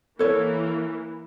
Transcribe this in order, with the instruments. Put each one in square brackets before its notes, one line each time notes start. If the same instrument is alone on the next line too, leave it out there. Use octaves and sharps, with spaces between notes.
[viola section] E3 A#3 [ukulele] A4 C#5